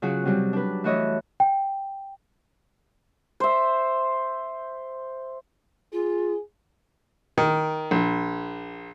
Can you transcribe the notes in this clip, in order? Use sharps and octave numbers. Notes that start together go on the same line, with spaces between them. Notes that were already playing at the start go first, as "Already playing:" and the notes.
C#3 F#3 F4 F#4
C3 F#3 G3
D4 B4
E3 A3 F#4 C#5 D#5 E5
G5
C5 E5
F4 G#4
D#3
A#1